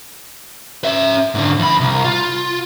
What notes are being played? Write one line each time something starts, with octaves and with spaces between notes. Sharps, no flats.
C#4 E5
G#2 D3
E2 B5
C2
F4